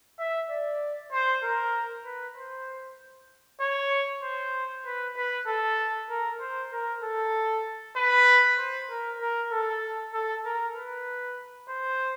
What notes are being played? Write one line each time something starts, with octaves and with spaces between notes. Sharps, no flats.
E5
D5
C5
A#4
B4
C5
C#5
C5
B4
B4
A4
A#4
C5
A#4
A4
B4
C5
A#4
A#4
A4
A4
A#4
B4
C5